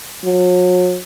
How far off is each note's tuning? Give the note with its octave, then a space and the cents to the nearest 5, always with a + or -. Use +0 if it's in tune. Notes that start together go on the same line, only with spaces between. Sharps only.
F#3 -40